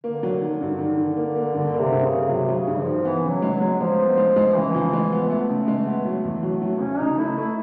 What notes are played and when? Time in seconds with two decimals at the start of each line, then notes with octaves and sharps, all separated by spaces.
0.04 D3 A#3
0.23 F#3
0.42 D#3
0.61 G2
0.79 D#3
0.97 D#3
1.17 A#3
1.36 A#3
1.54 G2 D3
1.74 A#3
1.80 C3
1.92 G2
2.05 C#3
2.11 A#3
2.29 C3 F#3
2.48 F#3
2.55 C#3
2.67 G2
2.80 F3
2.86 D#3
3.05 E3 B3
3.24 C#3
3.29 F#3
3.42 G#3
3.55 F#3
3.61 G#3
3.80 F3 G#3
3.98 B3
4.18 G#3
4.36 G#3
4.55 C#3 E3
4.75 F3
4.93 G#3
5.12 B3
5.30 A3 B3
5.50 C#3
5.68 G#3
5.87 B3
6.05 F#3
6.24 E2
6.43 F#3
6.62 F#3
6.81 C#3 C#4
7.00 C#3 D#4
7.18 A3 E4
7.37 A3 E4